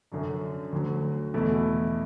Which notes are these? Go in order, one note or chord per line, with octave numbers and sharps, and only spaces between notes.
F#2 D3 F#3 D4
D2 D3 F#3
E2 B2 A3 E4